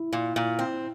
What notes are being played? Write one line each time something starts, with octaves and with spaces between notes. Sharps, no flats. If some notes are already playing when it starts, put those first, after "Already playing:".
Already playing: E4
A#2
A#2
C4